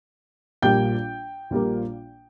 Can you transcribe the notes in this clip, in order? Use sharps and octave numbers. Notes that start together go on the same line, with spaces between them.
A#1 A#2 G3 A#3 G5 G6
A#1 A#2 G3 A#3